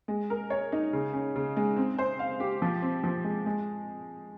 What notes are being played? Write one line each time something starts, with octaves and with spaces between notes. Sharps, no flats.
G#3
A#4
C#5
D#4
C#3
C#4
C#3
G#3
C4
C5
F5
G4
F3
C4
F3
G#3
G#3